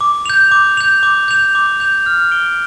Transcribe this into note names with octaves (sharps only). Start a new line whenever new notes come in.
D6
G6 F7
D6
G6 F7
D6
G6 F7
D6
G6 F7
F6
D7 G7